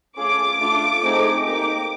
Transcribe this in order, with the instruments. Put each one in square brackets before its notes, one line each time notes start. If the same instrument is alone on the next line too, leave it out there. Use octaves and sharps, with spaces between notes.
[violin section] A3 C#4 F4 G#4 D6
A3 D4 F4 A4
A3 C4 D#4 G#4
A#3 D#4 G4 D6